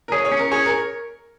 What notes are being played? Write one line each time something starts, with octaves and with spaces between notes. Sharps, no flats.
A#4
G#4 C#5
C#5
C#4
A#4
G#4 C#5
A#4